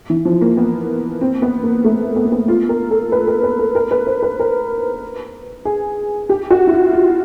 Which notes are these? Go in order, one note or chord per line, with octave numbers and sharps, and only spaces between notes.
E3
F3
A#3
B3
C4
B3
A#3
A3
B3
A#3
B3
F4
A#4
A4
B4
A#4
B4
A4
A#4
B4
C5
B4
A#4
G#4
G4
F#4
E4
F4
F4